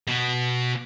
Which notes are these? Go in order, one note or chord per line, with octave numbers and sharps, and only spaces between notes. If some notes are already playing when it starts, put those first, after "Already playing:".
B2 B3